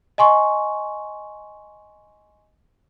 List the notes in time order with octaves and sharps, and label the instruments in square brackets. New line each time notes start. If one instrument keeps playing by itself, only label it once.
[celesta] D#5 G#5 C6 C#6